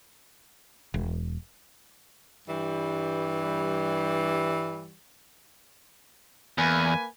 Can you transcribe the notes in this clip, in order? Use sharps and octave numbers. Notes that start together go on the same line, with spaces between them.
E1
G2 E3 G3
E2 A#3 B4 G#5